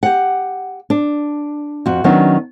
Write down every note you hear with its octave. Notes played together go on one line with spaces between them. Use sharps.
G4 F#5
D4
F2 F#4
D#3 F#3 B3 C#4 D4